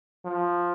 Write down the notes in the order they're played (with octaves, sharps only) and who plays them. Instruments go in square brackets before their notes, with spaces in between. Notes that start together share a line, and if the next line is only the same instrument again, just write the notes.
[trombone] F3